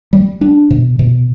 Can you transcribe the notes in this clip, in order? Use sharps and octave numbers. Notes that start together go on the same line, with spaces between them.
G3
D4
B2
B2